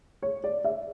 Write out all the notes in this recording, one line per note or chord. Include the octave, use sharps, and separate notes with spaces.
C#5
D5
E5